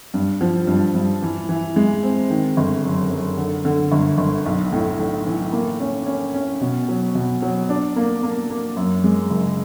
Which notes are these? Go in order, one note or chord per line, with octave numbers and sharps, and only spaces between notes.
G2
F3
G2
G2
E3
E3
G#3
C4
D#3
G1
F#2
F#2
D3
D3
G1
G1
B1
A2
A2
E3
A#3
C#4
C#4
C#4
B2
F#3
B2
F#3
D4
A#3
A#3
A#3
F#2
G#3
F#1